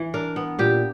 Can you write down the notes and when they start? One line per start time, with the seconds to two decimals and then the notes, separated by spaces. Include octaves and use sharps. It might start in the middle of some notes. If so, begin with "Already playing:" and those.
Already playing: E3
0.14 D4 A#4
0.36 B3
0.59 A#2 G4